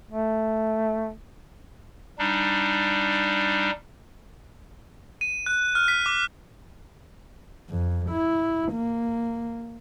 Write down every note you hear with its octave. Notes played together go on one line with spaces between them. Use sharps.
A3
G3 D4 D#4
D#7
F#6
F6
B6
D6
F2
E4
A#3